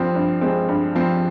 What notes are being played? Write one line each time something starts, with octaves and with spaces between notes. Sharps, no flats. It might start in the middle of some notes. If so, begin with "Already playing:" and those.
Already playing: G2 F3 C4
G2
G#3 C4
G2
F3 C4